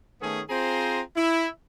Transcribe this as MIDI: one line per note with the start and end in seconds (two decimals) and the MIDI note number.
0.21 0.41 51
0.21 0.41 57
0.21 0.41 59
0.21 0.41 61
0.21 0.41 68
0.49 1.01 60
0.49 1.01 65
0.49 1.01 68
0.49 1.01 72
0.49 1.01 82
1.16 1.48 64